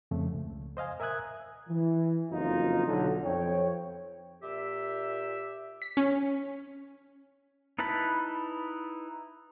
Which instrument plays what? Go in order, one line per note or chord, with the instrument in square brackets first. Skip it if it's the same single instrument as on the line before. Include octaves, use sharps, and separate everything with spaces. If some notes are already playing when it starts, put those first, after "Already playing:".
[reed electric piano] F2 C#3 F3 A3
C#2
C5 D#5 F5 G#5
A#4 E5 G#5 D#6 F#6 G#6
[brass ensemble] E3
F#1 F2 D#4 F4
B1 D3 F#3
F2 C#5 G5
[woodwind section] A#2 G4 E5
[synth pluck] B6
C#4
[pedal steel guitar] D#4 E4 B4 A5 B5